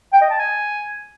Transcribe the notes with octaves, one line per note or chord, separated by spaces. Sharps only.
G5
D#5
A5
G#5